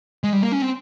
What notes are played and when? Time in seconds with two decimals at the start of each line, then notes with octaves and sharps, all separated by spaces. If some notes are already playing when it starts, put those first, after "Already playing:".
0.24 G#3
0.33 G3
0.43 A#3
0.52 C#4
0.62 C4